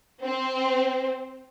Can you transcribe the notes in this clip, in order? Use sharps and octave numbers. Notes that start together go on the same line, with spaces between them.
C4 C5